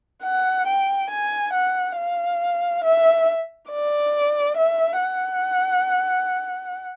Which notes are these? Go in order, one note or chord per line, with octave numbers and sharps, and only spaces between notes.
F#5
G5
G#5
F#5
F5
E5
D5
E5
F#5